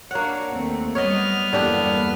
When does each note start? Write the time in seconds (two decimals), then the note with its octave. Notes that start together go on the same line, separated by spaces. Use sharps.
0.11 A#3 D4 F#4 C#5 F#5
0.52 D#2 A3 C4
0.95 F#3 G3 B3 C#5 D#5 F6
1.53 E2 G2 D3 A#3 D4 G4